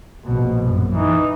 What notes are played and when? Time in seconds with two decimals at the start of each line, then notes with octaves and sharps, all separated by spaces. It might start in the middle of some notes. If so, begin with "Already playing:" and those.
0.25 A#1 B2
0.64 F#2
0.93 E3 D#4